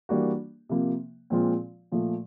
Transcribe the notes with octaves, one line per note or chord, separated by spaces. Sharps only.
E3 G3 A#3 D4 F#4
C3 F3 A#3
A#2 F3 G#3 C4 F4
A#2 F3 A3